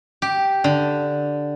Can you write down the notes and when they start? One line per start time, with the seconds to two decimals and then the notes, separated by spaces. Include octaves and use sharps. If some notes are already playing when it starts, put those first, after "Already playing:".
0.22 G4
0.64 D3